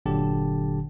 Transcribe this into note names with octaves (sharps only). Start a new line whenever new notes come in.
G1 A#2 D3 F#3 G4 A5